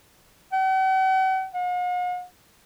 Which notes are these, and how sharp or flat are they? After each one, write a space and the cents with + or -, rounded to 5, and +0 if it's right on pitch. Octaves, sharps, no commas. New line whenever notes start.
F#5 +45
F#5 -45